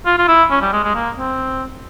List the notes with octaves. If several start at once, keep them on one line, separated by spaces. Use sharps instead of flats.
F4
F4
E4
C#4
G3
G#3
G#3
A#3
C4